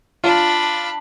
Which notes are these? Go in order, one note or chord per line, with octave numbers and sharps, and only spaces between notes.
D4 F4 B5